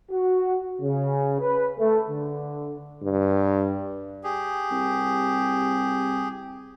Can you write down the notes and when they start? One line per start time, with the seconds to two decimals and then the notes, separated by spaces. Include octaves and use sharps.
0.11 F#4
0.81 C#3
1.40 B4
1.79 A3
2.09 D3
3.03 G2
4.24 G4 G#4
4.71 C2